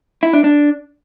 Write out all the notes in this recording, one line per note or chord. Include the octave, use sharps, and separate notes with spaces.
E4
D4
D4